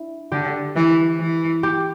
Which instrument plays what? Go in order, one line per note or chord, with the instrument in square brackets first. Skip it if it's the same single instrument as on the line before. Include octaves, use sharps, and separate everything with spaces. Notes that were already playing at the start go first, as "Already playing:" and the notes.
Already playing: [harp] D4 E4
[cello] D3 [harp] G4
[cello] E3
E3
[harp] G4